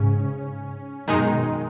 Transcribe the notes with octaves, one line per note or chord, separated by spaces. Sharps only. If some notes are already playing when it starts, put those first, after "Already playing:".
Already playing: G#2 C#3 C#4
F#2 B2 D#3 G#3 D#4